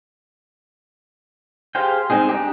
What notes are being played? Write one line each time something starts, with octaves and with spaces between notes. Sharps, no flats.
G4 G#4 C5 F5 G5
G#3 C4 D#4 G#4
D4 D#4 G4